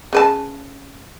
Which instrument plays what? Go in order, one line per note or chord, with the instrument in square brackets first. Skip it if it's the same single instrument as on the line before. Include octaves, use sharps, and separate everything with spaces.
[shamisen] C#3 B4 A5